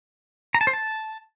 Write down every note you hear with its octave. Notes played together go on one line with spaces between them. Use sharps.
A#5
A5
C5
A5